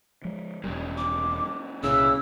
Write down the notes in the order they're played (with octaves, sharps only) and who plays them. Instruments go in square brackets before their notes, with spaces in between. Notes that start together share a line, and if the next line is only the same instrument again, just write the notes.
[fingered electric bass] F3 G#3
[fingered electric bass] E1 C2 G3 [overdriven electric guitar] A#2 C#3
[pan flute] D6
[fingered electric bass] C2 A#2 [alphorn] C#3 [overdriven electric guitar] E3 [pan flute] E6